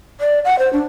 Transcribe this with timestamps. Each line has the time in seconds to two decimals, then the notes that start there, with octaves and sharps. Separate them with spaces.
0.21 D5
0.45 F#5
0.59 C5
0.73 D4